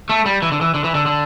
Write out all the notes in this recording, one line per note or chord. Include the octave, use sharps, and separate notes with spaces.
A3
G3
E3
D3
E3
D3
E3
D3
D3